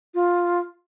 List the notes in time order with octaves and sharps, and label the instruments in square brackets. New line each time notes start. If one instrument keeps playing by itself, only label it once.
[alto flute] F4